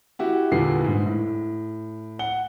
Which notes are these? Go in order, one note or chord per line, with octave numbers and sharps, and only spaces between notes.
E4 F#4 G4
E2 A#2 D3 G3 B3 C7
G#2
A2
F#5 G7